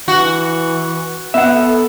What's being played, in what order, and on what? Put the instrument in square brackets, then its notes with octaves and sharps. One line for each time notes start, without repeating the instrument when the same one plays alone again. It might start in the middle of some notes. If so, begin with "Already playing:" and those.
[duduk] E3 [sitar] F#4
[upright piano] B3 [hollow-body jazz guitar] E5 F#5
[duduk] A4